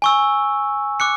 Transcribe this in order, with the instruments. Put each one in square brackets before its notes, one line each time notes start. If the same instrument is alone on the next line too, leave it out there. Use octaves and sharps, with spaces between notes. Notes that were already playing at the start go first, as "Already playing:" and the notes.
[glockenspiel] G#5 C#6 E6
D6 F#6 C#7